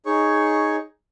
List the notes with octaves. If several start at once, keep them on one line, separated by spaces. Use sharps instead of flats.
D#4 G#4 C#5 C#6